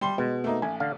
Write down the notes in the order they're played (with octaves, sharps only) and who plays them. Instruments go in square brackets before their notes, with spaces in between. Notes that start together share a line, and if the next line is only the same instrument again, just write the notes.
[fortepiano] G3 C6
[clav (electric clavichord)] B2 [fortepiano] G#3
[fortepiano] A3 A#3 D#4
[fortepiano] A1 [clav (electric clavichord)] G#5
[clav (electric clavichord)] D3 F5